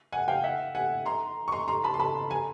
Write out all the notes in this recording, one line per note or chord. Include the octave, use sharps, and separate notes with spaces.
F#5 G#5
F5 G5
E5 F#5
F#5 G#5
A#5 C6
C#6
A#5 C6
A#5 C6
A5 B5
C6
A5 B5
G#5 A#5